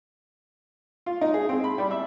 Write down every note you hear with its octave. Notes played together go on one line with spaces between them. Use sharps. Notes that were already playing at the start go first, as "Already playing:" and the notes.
F4
D#4
G#4
C4
B5
G3
E5